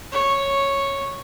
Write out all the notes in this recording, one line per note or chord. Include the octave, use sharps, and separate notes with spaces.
C#5